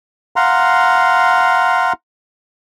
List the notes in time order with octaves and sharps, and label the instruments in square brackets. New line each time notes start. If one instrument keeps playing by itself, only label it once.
[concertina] F5 F#5 A#5 C6